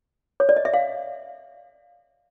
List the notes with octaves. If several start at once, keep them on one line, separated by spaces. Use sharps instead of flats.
C#5
D5
D#5
E5
F5